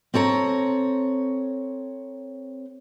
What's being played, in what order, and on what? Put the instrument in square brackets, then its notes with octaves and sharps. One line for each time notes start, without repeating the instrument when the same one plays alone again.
[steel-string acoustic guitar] C4 A4 C#5 A#5